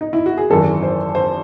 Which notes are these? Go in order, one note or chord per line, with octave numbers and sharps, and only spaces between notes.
D#4
E4
F#4
G#4
G#1 F#2 E3 A4
C5
C5